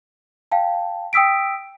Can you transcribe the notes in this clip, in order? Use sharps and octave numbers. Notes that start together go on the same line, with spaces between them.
F5 G5 A5
G5 D#6 E6 B6 D7